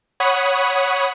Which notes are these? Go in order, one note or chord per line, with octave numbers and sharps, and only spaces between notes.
C#5 F#5 B5 D#6